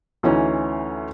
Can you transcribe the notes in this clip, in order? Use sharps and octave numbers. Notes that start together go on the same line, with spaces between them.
D2 E3 C#4 D#4